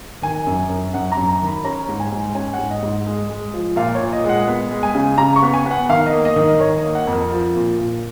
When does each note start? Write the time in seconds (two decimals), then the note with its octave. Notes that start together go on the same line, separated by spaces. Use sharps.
0.22 D#3 G#5
0.47 F#2
0.69 F#2
0.94 F#2 F#5
1.12 A#5
1.17 F#2
1.28 A#5
1.41 D#3
1.47 B5
1.64 C#4 A#5
1.89 G#2
2.00 G#5
2.12 G#2
2.35 C#4 G#5
2.53 G#2 F#5
2.71 D#5
2.83 G#2
3.06 G#3
3.29 G#3
3.54 F3
3.76 A#2 F5
3.95 A#2 C#5
4.13 D#5
4.25 G#3 F#5
4.48 B3
4.71 G#3
4.83 G#5
4.95 C#3
5.18 C#3 A#5
5.36 C#6
5.43 B3
5.54 G#5
5.66 B3
5.71 F#5
5.89 D#3 F5
6.06 D#5
6.13 A#3
6.25 D#5
6.36 D#3
6.42 D#5
6.59 D#3 C#5
6.78 D#5
6.83 A#3
6.95 F#5
7.07 F2
7.12 A#4
7.31 F3
7.54 A#2
7.78 A#2